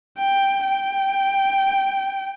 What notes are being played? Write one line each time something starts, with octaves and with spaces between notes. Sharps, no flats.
G5
G5